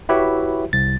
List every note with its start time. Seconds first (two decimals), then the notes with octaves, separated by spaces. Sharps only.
0.09 E4 F#4 G4 B4 C#5 E5
0.73 C2 A6